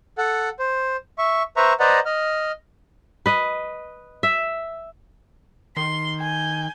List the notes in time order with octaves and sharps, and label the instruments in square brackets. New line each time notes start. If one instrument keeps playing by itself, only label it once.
[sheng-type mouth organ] A4 F#5
C5
E5 C#6
B4 C5 E5 A#5 C#6
B4 C5 D5 D#5 F#5 A#5
D#5 F6
[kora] B4 D#5
E5
[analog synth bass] D#3 [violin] C6
[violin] G#5 G6